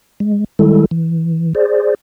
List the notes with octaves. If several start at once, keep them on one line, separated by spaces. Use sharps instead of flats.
G#3
D#3 G3 G#3 E4 A4
E3
G#4 C5 D5